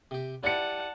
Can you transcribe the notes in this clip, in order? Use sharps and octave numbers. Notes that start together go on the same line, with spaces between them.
C3 G4
E4 G4 B4 D5 F#5 A5 C#7